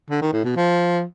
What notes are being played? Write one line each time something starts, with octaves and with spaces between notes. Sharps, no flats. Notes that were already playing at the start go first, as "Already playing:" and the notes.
D3
D#3
A2
B2
F3